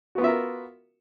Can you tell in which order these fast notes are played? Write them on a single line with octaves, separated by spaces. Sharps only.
F#4 B3 F4 E5 A#4